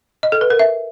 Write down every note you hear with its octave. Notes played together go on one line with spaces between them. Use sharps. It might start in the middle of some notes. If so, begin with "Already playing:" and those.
D#5
A4
B4
A#4
E5